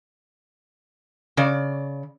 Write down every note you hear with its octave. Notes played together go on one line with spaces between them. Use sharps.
C#3 D5